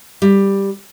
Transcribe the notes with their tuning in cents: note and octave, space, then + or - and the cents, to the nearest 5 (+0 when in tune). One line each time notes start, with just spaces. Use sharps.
G3 +5